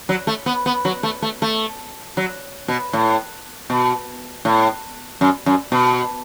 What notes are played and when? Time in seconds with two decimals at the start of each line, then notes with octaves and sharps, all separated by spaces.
0.09 F#3
0.27 A3
0.46 B3
0.66 B3
0.85 F#3
1.03 A3
1.22 A3
1.42 A3
2.17 F#3
2.68 B2
2.93 A2
3.70 B2
4.45 A2
5.21 F#2
5.46 F#2
5.72 B2